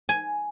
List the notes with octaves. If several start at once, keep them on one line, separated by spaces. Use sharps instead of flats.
G#5